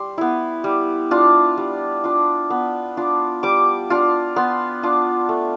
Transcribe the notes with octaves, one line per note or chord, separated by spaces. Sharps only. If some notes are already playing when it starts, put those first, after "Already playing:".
Already playing: G3 C6
B3 E4
G3
D4 F4
G3
D4 F4
B3
D4 F4
G3 D6
D4 F4
B3 C6
D4 F4
A3